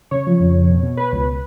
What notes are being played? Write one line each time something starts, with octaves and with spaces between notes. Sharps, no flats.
C#3 C#5
F3
F2
F2
B2
B2
B2 B4
C#2